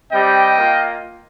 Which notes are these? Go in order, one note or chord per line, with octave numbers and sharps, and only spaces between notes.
G3 C4 G4 D#5 G5
A#3 F4